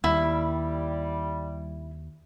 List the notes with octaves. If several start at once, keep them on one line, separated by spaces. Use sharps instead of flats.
D#2 G3 E4